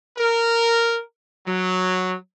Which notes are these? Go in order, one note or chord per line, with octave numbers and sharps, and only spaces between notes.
A#4
F#3